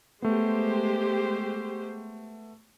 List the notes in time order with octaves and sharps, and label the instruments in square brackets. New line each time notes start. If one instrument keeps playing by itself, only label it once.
[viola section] G#3 G4 C5 [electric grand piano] A3 B3